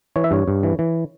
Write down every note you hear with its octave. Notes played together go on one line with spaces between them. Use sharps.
E3 C#5
E5
G2 C#5
G2
E3
E3